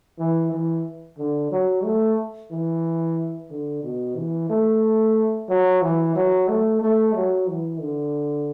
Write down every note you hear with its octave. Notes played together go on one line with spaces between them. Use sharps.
E3
E3
D3
F#3
A3
E3
D3
B2
E3
A3
F#3
E3
F#3
A3
A3
F#3
E3
D3